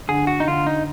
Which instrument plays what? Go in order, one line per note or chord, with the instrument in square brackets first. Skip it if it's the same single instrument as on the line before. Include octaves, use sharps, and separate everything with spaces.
[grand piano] D3 [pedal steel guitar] G#4
[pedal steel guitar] F#4
D#4
[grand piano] D3 [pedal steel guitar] F4
[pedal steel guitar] D#4